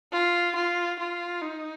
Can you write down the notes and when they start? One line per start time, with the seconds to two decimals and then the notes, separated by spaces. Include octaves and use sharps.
0.12 F4
0.56 F4
0.99 F4
1.42 D#4